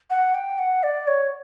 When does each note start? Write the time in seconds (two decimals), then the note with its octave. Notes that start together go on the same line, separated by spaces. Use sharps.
0.10 F#5
0.35 G5
0.59 F#5
0.83 D5
1.08 C#5